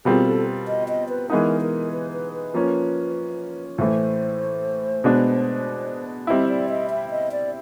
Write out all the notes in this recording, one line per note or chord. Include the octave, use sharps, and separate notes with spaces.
B2 G3 C4 F4 G#4 A#4
A4
D#5
D#5
B4
E3 G#3 B3 D#4 A#4
A#4
B4
B4
B4
F3 A#3 C#4
A2 E3 A3 C5
B2 G#3 B3 D4
G3 C4 E4 D#5
D5
D#5
E5
D#5
D5